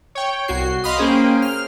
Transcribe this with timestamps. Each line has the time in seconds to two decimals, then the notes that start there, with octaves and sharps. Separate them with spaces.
0.15 C#5 G5
0.48 C2 F#4 C7
0.83 D#5 F5 B5 C6 D#6
0.97 A#3 C#4 G#4 C5 G5
1.42 F6